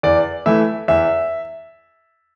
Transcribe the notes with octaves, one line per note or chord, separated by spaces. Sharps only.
E2 D5
E3 A3 E4 E5
E2 E5